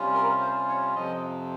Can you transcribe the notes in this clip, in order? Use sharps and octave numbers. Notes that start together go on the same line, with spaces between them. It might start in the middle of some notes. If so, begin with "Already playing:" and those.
Already playing: C3 G3 C#4 F4
A#4
C5
C#5
F2 C3 F3 D#5